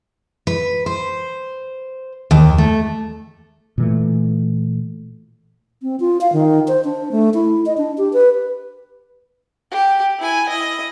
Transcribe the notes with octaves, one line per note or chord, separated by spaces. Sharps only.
B4
C5
D#2
A3
A#2 E3 A3
C4
F4
F5
D#3
C5
D4
A3
E4
D#5
D4
G4
B4
G4
E4 G#5
E4 D#5